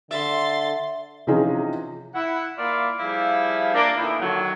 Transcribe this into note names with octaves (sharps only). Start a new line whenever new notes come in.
D3 E5 C6 A6
C3 E3 F3 C#4 D#4 G#4
E4 F#5
A#3 E4 F4 D5
F3 G3 E4 G#4 E5 F5
A#3 D4
A#2 D3 B3 D#4 E4
D3 D#3 F#3